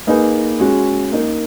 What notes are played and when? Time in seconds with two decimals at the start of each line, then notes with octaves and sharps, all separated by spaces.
0.07 A#3 D#4 G#4 B4
0.60 G#3 C#4 F#4
1.12 A#3 D#4 A#4